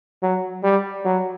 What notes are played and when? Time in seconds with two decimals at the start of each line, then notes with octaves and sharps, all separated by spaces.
0.23 F#3
0.63 G3
1.05 F#3